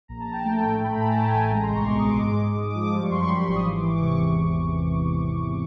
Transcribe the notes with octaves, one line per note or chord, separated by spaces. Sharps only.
A#1 A#5
A5
A#1
G5
A3 G5
A2
A3 B5
A#5
A2 A5
G#5
A3 G5
A1 G#5
G#3 A#5
C6
C2
C#6
B2 D6
D#6
G#3
D6
G#2 D6
G#2
G#2 D#6
D6
F3
D6
G3 D6
C#6
F#2 C6
B5
G3 C6
C#6
G#1
D#6
E3 D6
D6
E3
C#6
C3
E2